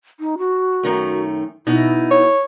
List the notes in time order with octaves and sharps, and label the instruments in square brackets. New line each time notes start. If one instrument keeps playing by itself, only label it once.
[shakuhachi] D#4
F#4
[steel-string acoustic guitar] F#2 D#3 A3
[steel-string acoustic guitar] B2 D#4 [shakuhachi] E4
[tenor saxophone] C#5